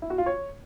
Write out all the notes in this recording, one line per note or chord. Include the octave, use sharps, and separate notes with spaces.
E4
F#4
F4
C#5